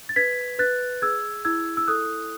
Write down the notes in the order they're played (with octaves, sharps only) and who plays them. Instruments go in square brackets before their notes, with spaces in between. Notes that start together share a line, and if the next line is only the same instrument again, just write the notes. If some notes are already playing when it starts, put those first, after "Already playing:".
[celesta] A6
B4 G#6 B6
B4 F#6 A6
G#4 E6 G#6
E4 E6 G#6
E6
A4 D#6 F#6